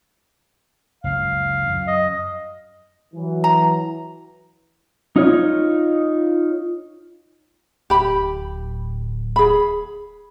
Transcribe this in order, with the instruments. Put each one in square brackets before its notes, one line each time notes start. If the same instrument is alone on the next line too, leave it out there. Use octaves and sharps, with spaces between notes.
[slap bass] F#1 C#2 [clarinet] F5
[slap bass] F#2 F#3
[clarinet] D#5
[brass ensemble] E3 F#3
[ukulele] A#5
[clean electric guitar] D#4 F4 C#5
[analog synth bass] D1 [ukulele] G4 B5
[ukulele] G#4 B5